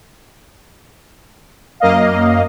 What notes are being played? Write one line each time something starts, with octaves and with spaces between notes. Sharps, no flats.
F#2 A#3 D#5 F5